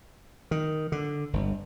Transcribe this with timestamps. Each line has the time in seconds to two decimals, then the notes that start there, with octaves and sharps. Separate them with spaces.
0.51 D#3
0.92 D3
1.33 G1